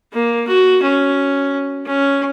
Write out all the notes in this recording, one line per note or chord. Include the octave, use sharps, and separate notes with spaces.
A#3
F#4
C#4
C#4